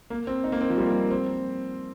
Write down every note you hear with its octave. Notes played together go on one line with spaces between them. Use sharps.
A#3
C4
D#4
A#3
C4
F3
G3
A#3
C4